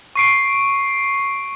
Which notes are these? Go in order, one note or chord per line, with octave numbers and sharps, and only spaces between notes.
C#6 C7 D7